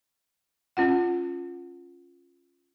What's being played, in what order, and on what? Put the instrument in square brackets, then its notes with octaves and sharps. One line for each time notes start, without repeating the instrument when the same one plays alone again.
[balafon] C#4 F4 F#5